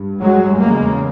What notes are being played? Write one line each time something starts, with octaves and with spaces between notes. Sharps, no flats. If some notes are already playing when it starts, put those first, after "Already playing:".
Already playing: G2
F#3 G#3
E2 C#3 G#3 A#3